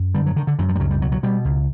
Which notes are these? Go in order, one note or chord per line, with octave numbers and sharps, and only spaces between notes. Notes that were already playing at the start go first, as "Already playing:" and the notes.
Already playing: F#2
D3 G3
F#3
D3 D#3
D3
F#2 D#3
F3
G3
C#2 F#3
G3
B2 F#3
F#3
B2 G3
C#2